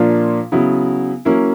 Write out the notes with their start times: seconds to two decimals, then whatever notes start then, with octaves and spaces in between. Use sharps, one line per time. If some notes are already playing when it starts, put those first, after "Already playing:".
Already playing: A#2 F3 A#3 D4 F4
0.52 C#3 F#3 B3 E4
1.25 F#3 A#3 C#4 E4